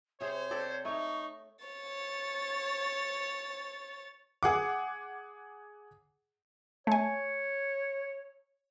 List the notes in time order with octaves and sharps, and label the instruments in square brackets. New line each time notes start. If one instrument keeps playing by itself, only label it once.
[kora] C3 G#4 [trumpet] C5 [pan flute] C#5
[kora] G4 A4 D5
[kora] A3 C#5 [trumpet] D#4 [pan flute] C#6
[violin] C#5 A6
[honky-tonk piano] G#4 F#5 D6
[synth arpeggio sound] A3 G#5 [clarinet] C#5